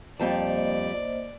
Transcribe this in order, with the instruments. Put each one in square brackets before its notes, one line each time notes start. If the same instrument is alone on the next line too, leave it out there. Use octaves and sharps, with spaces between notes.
[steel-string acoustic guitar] F2 G3 A5 [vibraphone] A#3 C5 D#5 [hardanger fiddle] D5